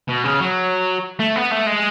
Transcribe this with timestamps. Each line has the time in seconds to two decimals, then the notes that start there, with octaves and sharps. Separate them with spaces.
0.09 B2
0.25 C#3
0.40 F#3
1.19 A3
1.36 B3
1.51 A3
1.66 G#3